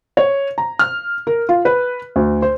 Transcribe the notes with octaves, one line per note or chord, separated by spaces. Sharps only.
C#5
A#5
F6
A#4
F4
B4
D2
C5